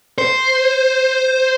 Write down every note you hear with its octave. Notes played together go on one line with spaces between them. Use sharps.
C5